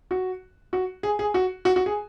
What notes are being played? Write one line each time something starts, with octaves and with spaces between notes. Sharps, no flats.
F#4
F#4
G#4
G#4
F#4
F#4
F#4
G#4